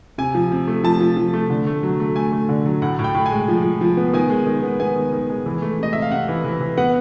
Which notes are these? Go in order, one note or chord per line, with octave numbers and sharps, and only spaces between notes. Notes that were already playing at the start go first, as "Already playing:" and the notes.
C3 G#5
F3
C3
A3
F3 A5
F3
F3
A3
D3
A3
F#3
A3
A3 G#5
A3
D3
F#3
A2 F#5
A2
G5
A2
G#5
G#3
F3
F3
F3
B3
D#3 G#5
G#3
D#3
B3
B3 G#5
D#3
D#3
G#3
E3
A3
C3 D#5
C3 E5
F5
C3 F#5
E3
E3
E3
B3 F#5